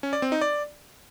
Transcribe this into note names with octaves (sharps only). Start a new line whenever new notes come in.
C#4
D5
C4
D#4
D5